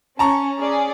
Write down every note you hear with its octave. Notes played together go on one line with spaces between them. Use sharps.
C#4 A5 A#5 C#6
C#4 G#4 D5